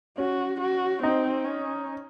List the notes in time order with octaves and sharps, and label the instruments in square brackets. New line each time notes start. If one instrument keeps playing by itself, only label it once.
[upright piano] C#4 [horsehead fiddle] F#4
[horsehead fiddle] F#4
[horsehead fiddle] C4 [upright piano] D#4
[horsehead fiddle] C#4